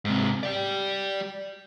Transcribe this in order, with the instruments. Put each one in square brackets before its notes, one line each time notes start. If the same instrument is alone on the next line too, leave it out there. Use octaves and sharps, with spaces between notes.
[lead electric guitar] G#2 C3
G4 D5